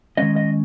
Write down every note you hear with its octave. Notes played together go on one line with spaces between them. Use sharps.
D#3 G#3 C#4 D#5
D#5